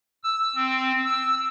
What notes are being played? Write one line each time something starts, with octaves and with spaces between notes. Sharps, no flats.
E6
C4
E6